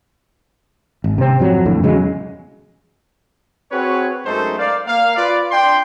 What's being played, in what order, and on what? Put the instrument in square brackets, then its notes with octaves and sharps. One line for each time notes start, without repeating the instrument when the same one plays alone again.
[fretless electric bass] G#1
C3 C4
G#1 F2 F#3
F2 A2 D3
E2 C#3 F#3 G#3
[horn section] C4 F#4 G#4 B4 C#5
F#2 G#3 A3 D#4 A4 C5
A#4 D5 F5
A#3 F5
F4 B4 D5
D4 G5 C6